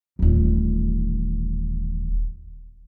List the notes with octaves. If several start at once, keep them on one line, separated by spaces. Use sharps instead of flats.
D#1 A1